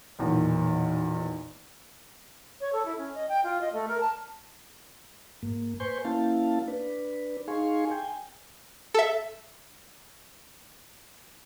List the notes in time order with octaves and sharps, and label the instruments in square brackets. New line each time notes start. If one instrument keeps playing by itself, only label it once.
[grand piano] B1 E2 A#2 D#3 E3
[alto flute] C#5
A4
E4
C#4
D#5
G5
F4
D#5
A3
A#4
A5
[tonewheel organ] G#2 A#3
B4 C5 G#5 C6 C#6 G6
A#3 C#4 E4 F5 A5
D4 B4
D#4 G#4 F5 G#5 C6 C#6
G5 G#5
[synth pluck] A4 E5